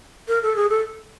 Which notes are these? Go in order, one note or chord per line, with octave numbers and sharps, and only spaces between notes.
A#4
A4
G#4
A4